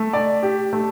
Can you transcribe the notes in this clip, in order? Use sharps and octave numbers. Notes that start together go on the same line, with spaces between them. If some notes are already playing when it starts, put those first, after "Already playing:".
Already playing: A3
D5
G4
A3